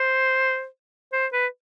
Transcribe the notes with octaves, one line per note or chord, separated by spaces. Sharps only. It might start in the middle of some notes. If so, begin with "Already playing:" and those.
Already playing: C5
C5
B4